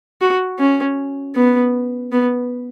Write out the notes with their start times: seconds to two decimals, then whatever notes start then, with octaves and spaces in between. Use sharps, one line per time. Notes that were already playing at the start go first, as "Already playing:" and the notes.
0.21 F#4
0.59 C#4
1.36 B3
2.12 B3